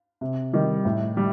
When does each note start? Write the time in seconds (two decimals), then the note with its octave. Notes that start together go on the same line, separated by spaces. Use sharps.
0.21 C3
0.53 D#3 G3
0.85 A2
1.17 G3